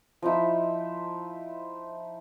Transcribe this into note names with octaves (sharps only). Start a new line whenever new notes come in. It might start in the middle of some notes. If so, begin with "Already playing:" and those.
F3 D#4 E4